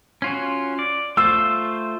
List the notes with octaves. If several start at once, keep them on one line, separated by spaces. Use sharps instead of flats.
C#4 F4 F#4
D5
A3 F4 C5 E6